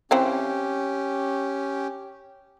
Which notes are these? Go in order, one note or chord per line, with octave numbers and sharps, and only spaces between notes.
E3 C4 C#4 G4 F5